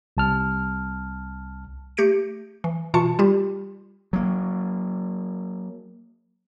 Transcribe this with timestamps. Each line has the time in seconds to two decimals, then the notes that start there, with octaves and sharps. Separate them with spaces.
0.17 C2 A5 F6
1.97 A3 G4 G6 A#6 C#7 D7
2.64 E3
2.94 B2 E3 F4 A5 C#6 C#7
3.19 G3 F4 G4
4.13 F#3 A#3